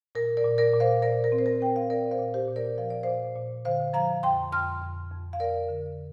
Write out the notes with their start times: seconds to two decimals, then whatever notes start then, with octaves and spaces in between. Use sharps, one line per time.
0.15 A#2 A#4
0.37 A#4 D5
0.44 A#2
0.58 A#4 D5
0.74 A#2
0.80 C5 F5
1.02 A#2 A#4 D5
1.24 A#4
1.32 C4
1.39 C5
1.46 A#4
1.61 C4 G5
1.76 F5
1.90 C4 A#4 D5
2.11 C5 F5
2.19 A#2
2.34 G4 C5
2.48 A#2
2.56 A#4 D5
2.78 F3 F5
2.90 D5
3.03 A#2 C5 F5
3.36 A#2
3.65 D3 C5 F5
3.94 F3 F5 A#5
4.23 F2 G5 C6
4.52 F2 C6 F6
4.82 F2
5.11 F2
5.33 F5
5.40 F2 A#4 D5
5.68 D3